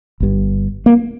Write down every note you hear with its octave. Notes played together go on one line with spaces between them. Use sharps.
G1 G2
A#3